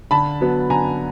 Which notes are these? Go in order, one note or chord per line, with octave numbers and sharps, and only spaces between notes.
D3 A5 B5
F#3 B3
D3 G#5 A#5